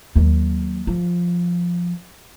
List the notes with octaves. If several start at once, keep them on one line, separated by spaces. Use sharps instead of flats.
D#2 F#3
F3